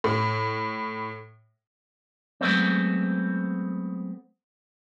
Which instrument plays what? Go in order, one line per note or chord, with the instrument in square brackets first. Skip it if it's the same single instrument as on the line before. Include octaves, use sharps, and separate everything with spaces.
[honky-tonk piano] A2
[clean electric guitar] F#3 G#3 A3 B3 C4